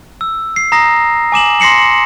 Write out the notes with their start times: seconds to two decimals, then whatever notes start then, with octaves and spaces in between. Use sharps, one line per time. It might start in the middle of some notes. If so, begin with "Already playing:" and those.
0.21 E6
0.56 C7
0.72 A#5 D#6 A#6 C7
0.84 A#6
1.32 G#5 D6 E7 F#7
1.60 C6 A#6 C7 C#7 F#7